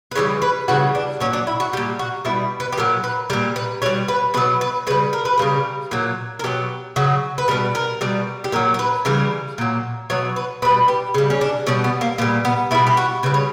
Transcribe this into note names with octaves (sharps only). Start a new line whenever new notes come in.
B4
C#3 E3 G3 C#5
B4
C#3 E3 G3 F#4
D4
A#2 F#3 C#4
D4
E4
F#4
A#2 G3 G4
F#4
B2 G3 E4
B4
G4
A#2 F#3 A#4
B4
A#2 G3 A#4
B4
B2 G3 C#5
B4
B2 F#3 B4
B4
C#3 G3 B4
A#4
B4
C#3 G3 A#4
A#2 F#3
A#4
B2 F#3 G4
C#3 F#3 F#4
B4
B2 G3 A#4
A#4
B2 G3
G4
A#2 F#3 A#4
A#4
B4
C#3 E3 G3 A#4
A#2 F#3
B2 F#3 C#5
B4
B2 G3 B4
G4
C#3 G3
C#4
D4
B2 G3 C#4
B3
A#3
A#2 G3 B3
B3
B2 G3 E4
G4
F#4
C#3 G3 B4
C#5